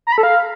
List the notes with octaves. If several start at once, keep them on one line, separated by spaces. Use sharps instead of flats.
A#5
B5
A4
F5